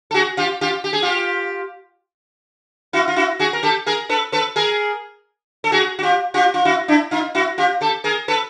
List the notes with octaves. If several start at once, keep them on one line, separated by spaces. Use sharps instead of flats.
A4
F#4 G#4
F4 G4
F4 G4
G4
G#4
F4 G4
E4 F#4
F4
E4 F#4
F#4 G#4
A#4
G4 A4
G#4 A#4
A4 B4
A4 B4
G#4 A#4
A4
F#4 G#4
F#4
F4 G4
F4 G4
F4
E4 F#4
D4 E4
D#4 F4
E4 F#4
F4 G4
G4 A4
G#4 A#4
A4 B4